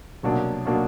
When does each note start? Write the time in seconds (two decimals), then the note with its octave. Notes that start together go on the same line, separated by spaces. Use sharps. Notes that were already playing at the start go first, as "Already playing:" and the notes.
0.23 C2 B2 F#3 A#3 D4
0.65 B2 F#3 A#3 D4